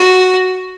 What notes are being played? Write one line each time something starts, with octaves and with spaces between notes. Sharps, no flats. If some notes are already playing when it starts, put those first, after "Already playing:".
Already playing: F#4